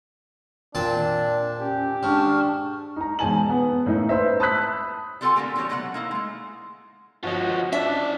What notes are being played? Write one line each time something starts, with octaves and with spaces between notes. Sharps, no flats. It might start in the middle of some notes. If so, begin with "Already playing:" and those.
A#2 C4 D4 A5
C#4 G4
G#2 D4 A5 C#6 F6
D#4 A#5
E1 G#2 G#5 A5 F#7
B3
A2 A#3 C#4 D#4 E4
B4 C5 E5
A5 B5 D#6 E6 F#6 B6
G3 C4 F4 A4 F#5 G#5
D3 G3 A3 A#3 G4
D3 D#3 F#3 C#4 C#5
B2 F#3 A3 B3 D5 F#5
A#3 D#4 E4
G#3 A3
G1 F3 F4 F#4 C#5 D#5
C#4 D4 E5 A5